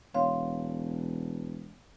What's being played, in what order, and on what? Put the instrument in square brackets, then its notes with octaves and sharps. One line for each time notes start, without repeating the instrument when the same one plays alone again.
[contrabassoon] E1 [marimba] C#5 F5 C6